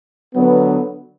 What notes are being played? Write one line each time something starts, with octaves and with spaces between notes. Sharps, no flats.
D3 F#3 B3